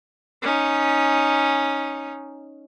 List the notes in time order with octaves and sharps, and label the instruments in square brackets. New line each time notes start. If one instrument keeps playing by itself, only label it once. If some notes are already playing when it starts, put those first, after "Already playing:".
[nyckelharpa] C#4 D#4